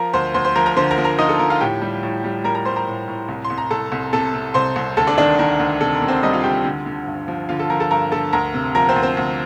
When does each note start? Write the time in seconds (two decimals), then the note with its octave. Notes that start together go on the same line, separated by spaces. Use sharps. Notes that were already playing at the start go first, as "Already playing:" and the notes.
Already playing: F3 A#4 A#5
0.13 D2 C5 C6
0.34 D2 C5 C6
0.45 C5 C6
0.55 F3 A#4 A#5
0.66 A#4 A#5
0.76 D3 C5 C6
0.91 A#4 A#5
0.98 F3
1.04 A#4 A#5
1.19 F3 D#4 D#5
1.29 A4
1.39 F3 A#4
1.50 F4 F5
1.61 A2 G4 G5
1.82 G3
2.03 A2
2.24 G3
2.44 G3 A#4 A#5
2.55 A#4 A#5
2.65 G3 C5 C6
2.76 A#4 A#5
2.87 A2
3.08 A2
3.28 C2
3.44 C6
3.50 C2
3.58 A#5
3.70 C2 A4 A5
3.92 C2
4.13 C3 A4 A5
4.34 C3
4.54 C2 C5 C6
4.76 C2
4.97 D2 A4 A5
5.07 D4 D5
5.18 D#3 D4 D5
5.39 D#3 A#4
5.59 D2
5.81 C3 A4
5.95 A#4
6.02 C3
6.08 C4 C5
6.23 G3 D#4 D#5
6.33 F4 F5
6.43 D2 G4 G5
6.65 D3
6.86 D3
7.06 G2
7.28 F3
7.49 D3 F4 F5
7.60 A4 A5
7.70 F3 A#4 A#5
7.80 A4 A5
7.91 G2 A#4 A#5
8.12 D3 A4 A5
8.33 D2 A#4 A#5
8.54 C3
8.75 F3 A#4 A#5
8.89 C4 C5
8.96 D2
9.03 C4 C5
9.17 D2